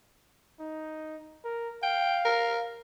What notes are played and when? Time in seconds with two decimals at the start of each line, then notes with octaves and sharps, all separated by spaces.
0.60 D#4
1.44 A#4
1.83 F5 G5
2.25 A#4